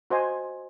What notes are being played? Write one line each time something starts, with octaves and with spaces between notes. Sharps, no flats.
F#4 C5 D#5 G#5